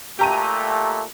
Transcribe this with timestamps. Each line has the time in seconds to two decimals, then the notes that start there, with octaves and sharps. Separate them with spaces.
0.19 A#2 A3 G4 A#5 D#7